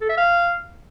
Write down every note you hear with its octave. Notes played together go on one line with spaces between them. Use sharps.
A4
E5
F5